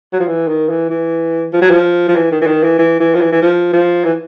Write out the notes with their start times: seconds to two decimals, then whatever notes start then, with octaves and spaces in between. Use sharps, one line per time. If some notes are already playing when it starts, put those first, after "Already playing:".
0.13 F#3
0.20 F3
0.28 E3
0.48 D#3
0.69 E3
0.90 E3
1.53 F3
1.62 F#3
1.70 F3
2.08 F3
2.16 E3
2.32 D#3
2.42 E3
2.47 D#3
2.63 E3
2.79 E3
3.00 E3
3.15 F3
3.21 E3
3.32 E3
3.42 F3
3.73 F3
4.04 E3